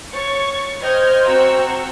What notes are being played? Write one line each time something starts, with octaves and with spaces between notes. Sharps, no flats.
C#5 C#6 A6
C5 D#5 G5 F6 G#6
C4 F#4 A#5 C#6 E6